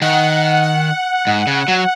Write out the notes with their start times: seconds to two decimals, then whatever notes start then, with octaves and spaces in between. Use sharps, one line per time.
0.02 D#3 F#5
0.63 F#5
1.27 G#2
1.47 C#3
1.68 F#3